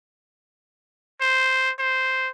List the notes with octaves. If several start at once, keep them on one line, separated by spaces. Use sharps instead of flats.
C5
C5